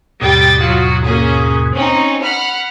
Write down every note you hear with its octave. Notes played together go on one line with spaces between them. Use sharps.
D#2 G#2 B2 G3 G5 A6
F#3 F4 F#4
A#3 C#4 G#4
C4 C#4 D#4
F#5 B5 F6